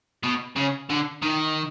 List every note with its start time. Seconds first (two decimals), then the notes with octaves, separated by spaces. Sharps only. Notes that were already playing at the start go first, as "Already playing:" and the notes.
0.23 B2
0.56 C#3
0.90 D3
1.22 D#3